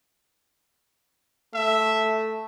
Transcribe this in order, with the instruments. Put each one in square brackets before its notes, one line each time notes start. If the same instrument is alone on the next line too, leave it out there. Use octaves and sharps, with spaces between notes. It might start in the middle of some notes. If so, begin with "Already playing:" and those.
[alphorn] A3 [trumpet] E5